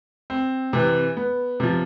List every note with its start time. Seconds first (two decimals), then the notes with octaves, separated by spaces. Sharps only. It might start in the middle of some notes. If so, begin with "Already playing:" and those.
0.30 C4
0.73 C3 E3
1.17 B3
1.60 C3 F3